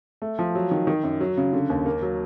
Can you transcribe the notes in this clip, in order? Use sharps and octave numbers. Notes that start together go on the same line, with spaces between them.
A3
F3
F#3
D#3
D#3
F#2
F#3
C#3
D3
D#2
A#3
F#3